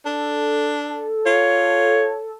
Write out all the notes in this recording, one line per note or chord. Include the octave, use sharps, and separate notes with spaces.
D4 A4
F4 C#5